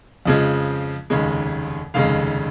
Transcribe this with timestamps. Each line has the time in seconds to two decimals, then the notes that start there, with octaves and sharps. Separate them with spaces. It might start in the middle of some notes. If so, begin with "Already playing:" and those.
0.25 F2 C#3 F3 G#3
1.10 F1 D#2 C#3 G#3
1.94 F1 D#2 C#3 G#3 F5